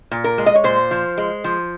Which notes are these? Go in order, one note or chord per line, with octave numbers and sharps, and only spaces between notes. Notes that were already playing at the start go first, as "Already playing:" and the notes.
A#2
A#4
G#3
D#5
C#5
A#2 C5
F3
G#3
F3